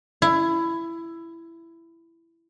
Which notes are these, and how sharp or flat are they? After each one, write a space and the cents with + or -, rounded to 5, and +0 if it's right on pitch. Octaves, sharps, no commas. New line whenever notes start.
E4 +15